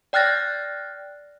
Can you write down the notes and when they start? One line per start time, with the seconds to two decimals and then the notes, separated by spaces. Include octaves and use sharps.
0.13 D5 G5 F6 F#6 A6 A#6